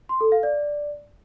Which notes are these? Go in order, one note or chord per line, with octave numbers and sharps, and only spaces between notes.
C6
A4
F5
D5